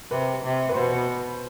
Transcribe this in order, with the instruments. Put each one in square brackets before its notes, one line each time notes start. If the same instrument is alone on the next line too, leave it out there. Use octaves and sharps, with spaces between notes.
[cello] C3 [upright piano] B4
[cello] C3
[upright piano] B4
[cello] B2 [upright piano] C5